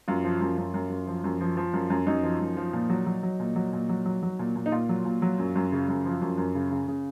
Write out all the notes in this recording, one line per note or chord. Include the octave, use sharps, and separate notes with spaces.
F#2 F4
F3
F#2
F#2
F#2
F#2
F3
F#2
F3
F3
F#2
F#2
F#2 D#4
F3
F#2
F3
A#2
F#3
F#3
F#3
A#2
F#3
A#2
F#3
F#3
F#3
A#2
A#2
D#4
A#2 F4
F#3
A#2
F#3
F#2
F#2
C#3
F#2
F3
F#2
F#2
C#3
C#3
C#3